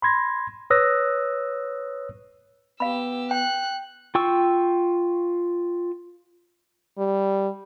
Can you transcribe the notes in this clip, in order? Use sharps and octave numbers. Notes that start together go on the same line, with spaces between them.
B5 C6 G#6 A#6
B4 C#5 D#6 E6 F#6 A#6
B3 G4 F5 B5 E6
G5 F#6
F4 G5 C#6 E6
G3